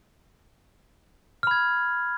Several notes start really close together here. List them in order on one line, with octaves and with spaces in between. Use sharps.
F6 B5 G#6